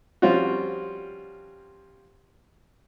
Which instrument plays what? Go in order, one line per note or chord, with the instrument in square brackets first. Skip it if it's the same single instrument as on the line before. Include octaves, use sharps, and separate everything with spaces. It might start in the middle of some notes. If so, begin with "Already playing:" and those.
[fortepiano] F3 G3 C4 C#4 F4 F#4